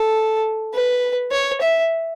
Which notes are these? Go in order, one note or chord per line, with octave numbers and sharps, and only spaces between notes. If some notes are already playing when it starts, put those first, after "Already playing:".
Already playing: A4
B4
C#5
E5